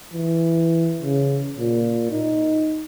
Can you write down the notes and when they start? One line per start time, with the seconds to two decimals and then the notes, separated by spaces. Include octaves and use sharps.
0.14 E3
1.02 C#3
1.58 A#2
2.11 D#4